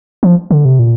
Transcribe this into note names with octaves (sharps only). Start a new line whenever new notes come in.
F3
D3
C3
A#2